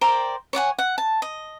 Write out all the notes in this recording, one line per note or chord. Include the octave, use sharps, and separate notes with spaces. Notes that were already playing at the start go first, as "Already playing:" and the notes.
A#4 C5 D5 G5
C#5 D5 F#5 G#5
F#5
A5
D#5